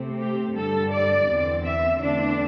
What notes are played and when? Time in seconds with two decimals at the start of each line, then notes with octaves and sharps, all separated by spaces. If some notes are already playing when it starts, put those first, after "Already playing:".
Already playing: C3 A3 C4
0.18 G4
0.55 G2 D3 G3 A4
0.91 D5
1.28 E2 D3 C4
1.64 E5
2.00 E2 D3 A3 C4 D4